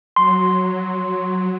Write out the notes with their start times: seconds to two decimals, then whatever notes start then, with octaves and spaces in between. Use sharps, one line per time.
0.16 F#3 C6